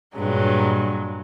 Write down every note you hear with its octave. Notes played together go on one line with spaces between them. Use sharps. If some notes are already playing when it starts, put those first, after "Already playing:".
G2 A#2 F#3 G#3